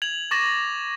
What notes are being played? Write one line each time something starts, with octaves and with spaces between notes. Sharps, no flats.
G#6 F7 F#7
C#6 D6 A6 A#6 E7 F#7